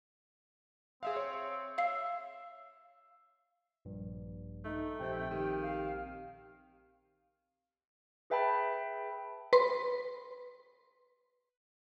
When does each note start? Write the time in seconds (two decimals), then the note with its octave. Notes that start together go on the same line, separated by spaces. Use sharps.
1.03 C4 G#4 E5 F5
1.16 C#5
1.78 E5 F5 C7
3.85 A#1 G2
4.65 A3 D#4
4.99 A#1 C3 C4 G5
5.31 D#3 G4
5.62 G4 F5
8.30 G#4 B4 E5 G5 A5 B5
9.53 B4 C6